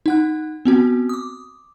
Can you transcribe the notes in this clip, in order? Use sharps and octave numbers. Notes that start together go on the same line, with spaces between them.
D#4 F#5 F#6
B3 C4 F#4
D6 D#6